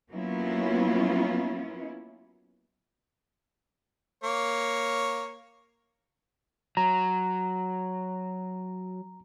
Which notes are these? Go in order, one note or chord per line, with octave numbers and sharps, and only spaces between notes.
F#3 A#3 B3 C#4 E4 F4
A#3 C#5
F#3 A#5